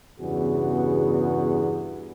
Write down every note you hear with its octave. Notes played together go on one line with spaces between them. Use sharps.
E2 G2 C#3 B3 F#4 G#4